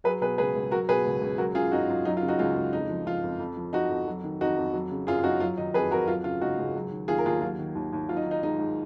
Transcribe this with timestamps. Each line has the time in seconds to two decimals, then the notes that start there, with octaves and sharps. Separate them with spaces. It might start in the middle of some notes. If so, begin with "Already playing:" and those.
0.04 F#3 G#4 B4
0.21 B2 G#4 B4
0.38 C#2 G#4 B4
0.55 C#2
0.71 F#3 F#4 A#4
0.89 B2 G#4 B4
1.05 C#2
1.22 C#2
1.38 F#3 F#4 A#4
1.55 C#3 F4 G#4
1.72 F#2 D#4 F#4
1.89 F#2 F4
2.05 F#3 D#4
2.17 F4
2.22 C#3
2.28 D#4 F#4
2.39 C#2 F4
2.55 C#2
2.73 F2 D#4
2.90 F3
3.06 F3 F4
3.24 F2
3.40 F2
3.57 F3
3.73 F3 D#4 F#4
3.90 F2
4.08 F#3
4.24 D#3
4.41 F2 D#4 F#4
4.57 F2
4.73 F#3
4.91 C#3
5.07 F#2 F4 G#4
5.24 F#2 D#4 F#4
5.40 F#3 F4
5.57 D#3 D#4
5.74 F2 G#4 B4
5.91 F2 F#4 A#4
6.07 F#3 F4
6.24 C#3 F4
6.41 C#2 D#4 F#4
6.59 C#2
6.75 F#3
6.91 D#3
7.08 D#2 F4 G#4
7.18 A#4
7.25 D#2 F4 G#4
7.42 F#3 F4
7.59 D#3
7.75 D#2
7.93 D#2
8.09 F#3 F4
8.17 D#4
8.26 D#3
8.31 D#4
8.43 G#2 D#4
8.59 G#2